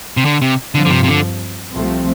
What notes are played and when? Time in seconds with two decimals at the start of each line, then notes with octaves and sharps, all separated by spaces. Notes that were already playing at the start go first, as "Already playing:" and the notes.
0.17 C3
0.25 D3
0.42 C3
0.75 G2 D3 F3 C4
0.85 D3
0.91 C3
1.04 C3
1.08 D3
1.73 C2 C3 F3 A3 C4